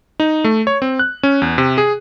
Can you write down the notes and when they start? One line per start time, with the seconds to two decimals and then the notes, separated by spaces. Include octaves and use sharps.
0.20 D#4
0.44 A3
0.67 C#5
0.82 C4
0.99 F#6
1.23 C#4
1.42 E2
1.58 C3
1.78 G#4